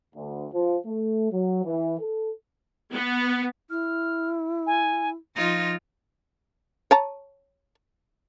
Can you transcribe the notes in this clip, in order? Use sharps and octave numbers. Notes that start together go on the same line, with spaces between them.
D2
F3
A3
F#3
E3
A4
B3
E4 F6
G#5
F3 D#4 F4 A#6
C#5 A5 A#5